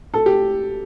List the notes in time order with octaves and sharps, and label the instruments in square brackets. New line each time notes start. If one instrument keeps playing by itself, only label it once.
[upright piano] A4
G4